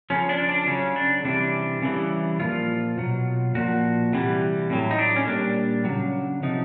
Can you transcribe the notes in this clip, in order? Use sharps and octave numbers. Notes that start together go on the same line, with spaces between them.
C#3 F3 C#4
D4
D4
C#3 F#3 C#4
D4
C3 E3 G3 D4
C#3 E3 G3
A#2 F3 F4
B2 F#3
A#2 F3 F#4
C3 E3 G3
A2 F#3
D#4
D4
C#4
A#2 G3 D4
C#3 F#3
C3 F3 D#4